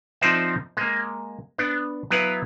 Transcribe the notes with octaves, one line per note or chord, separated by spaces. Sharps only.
F3 C4 D#4 C5 D5 E5
G#3 A#3
B3 D4
F#3 B3 E4 B4 F5 F#5